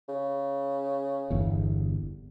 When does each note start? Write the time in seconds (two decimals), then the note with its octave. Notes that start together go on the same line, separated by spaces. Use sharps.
0.08 C#3
1.30 G1 E2